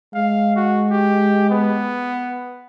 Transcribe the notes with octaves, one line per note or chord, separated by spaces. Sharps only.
G#3 F5
F#4
G4
B3